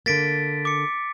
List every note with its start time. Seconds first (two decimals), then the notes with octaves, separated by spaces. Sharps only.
0.06 D3 A#3 A6 B6 D7
0.65 D6 C#7